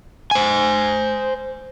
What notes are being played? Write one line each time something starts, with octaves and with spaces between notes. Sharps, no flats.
C5 G#5